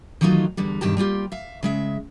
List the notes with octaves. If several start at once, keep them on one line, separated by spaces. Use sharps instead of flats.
D#3 E3 F#3 A3 D#4 F4
E2 G2 D3 G3
E2 G2 B2 D#3 G4 A5
G3 A#3 F4 G4
E5 F5
C#3 G#3 E5